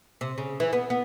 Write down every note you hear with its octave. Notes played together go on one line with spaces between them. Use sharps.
C3
C#3
E3
B3
B3